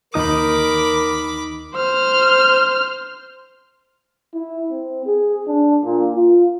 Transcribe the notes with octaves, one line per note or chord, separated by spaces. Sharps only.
D#2 D#4 A#4 B5 D6 D#6
C5 F6
E4
C4
G#4
D4
A#2
F4